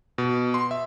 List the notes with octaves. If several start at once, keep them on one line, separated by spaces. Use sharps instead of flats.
B2
C6
E5